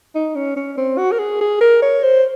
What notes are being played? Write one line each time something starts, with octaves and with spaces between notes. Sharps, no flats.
D#4
C#4
C#4
C4
F#4
A#4
G#4
G#4
A#4
C#5
C5